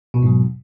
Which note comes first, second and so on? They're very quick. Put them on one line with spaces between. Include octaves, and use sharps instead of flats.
B2 E2 G#2 F#3